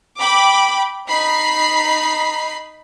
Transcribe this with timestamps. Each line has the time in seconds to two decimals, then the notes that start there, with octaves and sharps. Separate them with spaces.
0.19 G5 B5 D6
1.08 D#4 B5 C7